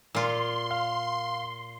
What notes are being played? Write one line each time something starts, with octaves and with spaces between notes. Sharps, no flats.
A#2 F4 C6
F5